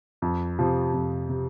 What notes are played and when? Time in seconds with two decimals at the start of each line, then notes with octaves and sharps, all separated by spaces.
0.22 F2
0.59 C3 F3
0.94 F2
1.29 C3